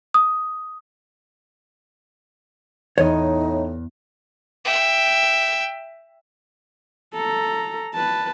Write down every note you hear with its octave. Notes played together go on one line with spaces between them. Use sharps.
D#6
E2 A2 D#4 C#5 D#5
E5 G5
A4 A#5
B4 A5